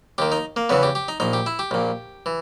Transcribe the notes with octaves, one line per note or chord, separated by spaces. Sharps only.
D#2 D#3 G4
D#4
A#3
E2 C#3 E3 B3
G4
G4
D#4
A#1 A#2 D#4
G4
E4
G4
A#1 A#2
E3